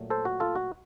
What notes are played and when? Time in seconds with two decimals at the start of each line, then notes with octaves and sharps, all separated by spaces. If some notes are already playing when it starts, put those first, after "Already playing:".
Already playing: A#2 F#3 A3
0.10 A4 C5
0.25 F#4
0.40 F4 A4
0.55 F#4